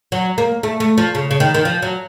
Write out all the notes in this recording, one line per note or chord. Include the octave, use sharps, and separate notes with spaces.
F#3
A#3
A3
A3
F3
C#3
C#3
D#3
D#3
F3
F#3